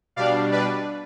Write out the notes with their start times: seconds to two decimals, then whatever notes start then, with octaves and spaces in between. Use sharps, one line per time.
0.16 B2 G3 D4 D5 F5
0.52 B4 D5